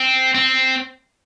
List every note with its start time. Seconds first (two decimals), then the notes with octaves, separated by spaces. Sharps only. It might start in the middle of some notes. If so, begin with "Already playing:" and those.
Already playing: C4
0.35 C4